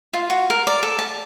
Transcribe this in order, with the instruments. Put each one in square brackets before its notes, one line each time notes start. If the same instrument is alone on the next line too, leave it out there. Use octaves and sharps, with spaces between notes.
[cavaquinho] F4
F#4
A#4
D5
A4
A5